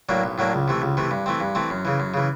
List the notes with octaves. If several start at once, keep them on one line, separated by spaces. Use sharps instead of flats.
A2 F#3 A#3 D4
B1
A2 F#3 A#3 D4
C#2
C3 E3 A3
C#2
C3 E3 A3
G2
E3 A3 C4
G2
E3 A3 C4
F#2
C#3 E3
F#2
C#3 E3